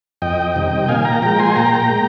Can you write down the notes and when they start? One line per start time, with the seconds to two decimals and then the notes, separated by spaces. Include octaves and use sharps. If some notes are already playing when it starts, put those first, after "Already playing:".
0.22 F2 D#5 G5
0.55 C3 D#3 G3
0.88 A#2 F5 G#5
1.05 G5 A#5
1.22 F3 G#3 G5 A#5
1.39 G#5 C6
1.56 A#2 G5 A#5
1.90 G#3